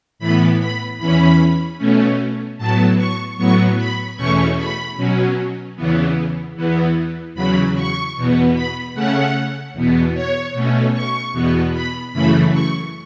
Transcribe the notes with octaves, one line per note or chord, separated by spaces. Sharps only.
A2 E3 B3 B5
B5
E2 E3 C#4 B5
B2 A3 C#4
A2 F#3 B3 A5
C#6
A2 F#3 B3 C#6
B5
E2 B2 A3 C#4 C#6
B5
B2 F#3 C#4
E2 C#3 E3 B3
E2 E3 B3
E2 C#3 F#3 B5
C#6
E2 B2 B3
B5
C#3 A3 C#4 F#5
E2 B2 B3
C#5
B2 A3 C#4
C#6
E2 B2 B3
B5
F#2 C#3 E3 A3 B5
C#6